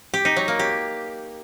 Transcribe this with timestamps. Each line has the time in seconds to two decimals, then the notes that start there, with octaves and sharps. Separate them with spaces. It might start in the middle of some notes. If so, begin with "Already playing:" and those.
0.14 G4
0.25 D#4
0.36 F#3
0.48 A#3
0.59 G4